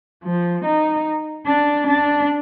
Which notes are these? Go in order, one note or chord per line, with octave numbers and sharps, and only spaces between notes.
F3
D#4
D4
D4